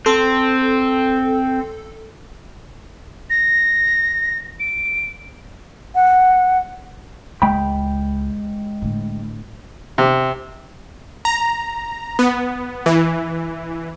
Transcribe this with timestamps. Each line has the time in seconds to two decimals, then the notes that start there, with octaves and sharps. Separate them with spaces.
0.06 C4 A4
3.30 A#6
4.60 D7
5.95 F#5
7.42 C#2 G#3 G5 B5
8.82 A2 D3
9.98 C3
11.25 A#5
12.19 B3
12.86 E3